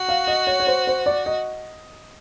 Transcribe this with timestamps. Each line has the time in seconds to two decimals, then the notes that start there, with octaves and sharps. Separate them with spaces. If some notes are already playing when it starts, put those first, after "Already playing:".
Already playing: F#4
0.09 F5
0.27 D#5
0.47 C#5
0.60 C#5
0.67 C5
0.87 C5
1.06 D5
1.26 D#5